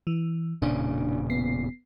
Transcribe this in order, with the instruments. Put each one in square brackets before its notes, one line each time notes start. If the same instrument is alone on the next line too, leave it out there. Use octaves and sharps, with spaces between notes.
[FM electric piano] E3
[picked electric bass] E1 A#2 C#3 [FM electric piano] D4
[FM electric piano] B3 C7